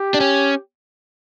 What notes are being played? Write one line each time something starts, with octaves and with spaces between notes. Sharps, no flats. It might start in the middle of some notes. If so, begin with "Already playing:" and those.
Already playing: G4
D4
C#4